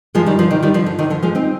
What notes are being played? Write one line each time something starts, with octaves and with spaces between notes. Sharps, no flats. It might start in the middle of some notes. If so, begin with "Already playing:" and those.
F3 G#3
D#3 G3
D3 F3
C3 D#3
D#3 G3
D3 F3
D3
C3 D#3
D3 F3
F3 G#3
C4 D#4